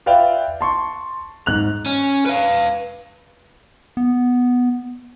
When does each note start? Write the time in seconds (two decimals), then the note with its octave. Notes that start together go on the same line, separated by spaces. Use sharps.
0.06 F4 B4 D5 E5 F5 G5
0.61 A5 C6 C#6
1.46 G#2 F#6 F7
1.86 C#4
2.26 B4 F5
3.97 B3